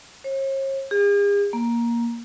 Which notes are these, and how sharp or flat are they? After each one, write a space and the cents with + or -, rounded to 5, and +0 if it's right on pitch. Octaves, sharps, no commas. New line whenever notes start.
C#5 -45
G#4 -45
A#3 +10